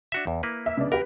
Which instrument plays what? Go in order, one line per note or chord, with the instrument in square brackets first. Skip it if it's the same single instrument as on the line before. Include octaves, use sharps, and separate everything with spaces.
[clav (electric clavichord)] D4 F#4 E5
E2
A#3 E4 B4
[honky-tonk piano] E5
C#3 B3 D4
[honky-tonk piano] G4 B4 [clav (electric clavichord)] A#4